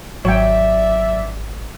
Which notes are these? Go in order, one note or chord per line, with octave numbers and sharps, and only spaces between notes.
G#1 F#3 C#5 D5 E5 G5